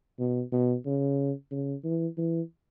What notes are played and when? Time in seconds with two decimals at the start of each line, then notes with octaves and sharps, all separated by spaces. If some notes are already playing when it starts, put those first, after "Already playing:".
0.19 B2
0.52 B2
0.85 C#3
1.52 C#3
1.84 E3
2.18 E3